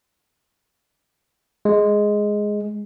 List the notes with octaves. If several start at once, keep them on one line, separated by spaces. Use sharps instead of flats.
G#3